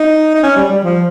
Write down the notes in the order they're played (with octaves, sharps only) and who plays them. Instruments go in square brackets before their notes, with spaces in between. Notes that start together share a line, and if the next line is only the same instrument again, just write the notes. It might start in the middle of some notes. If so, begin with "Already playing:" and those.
Already playing: [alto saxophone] D#4
D#4
C#4
G3
G3
F3